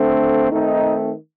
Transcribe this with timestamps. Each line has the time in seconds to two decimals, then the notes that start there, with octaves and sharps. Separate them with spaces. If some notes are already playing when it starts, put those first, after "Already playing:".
Already playing: D3 A3 C4
0.49 D#3 A3 C4 D#4